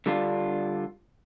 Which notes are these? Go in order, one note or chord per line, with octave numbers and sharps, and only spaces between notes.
D3 G3 D4 F4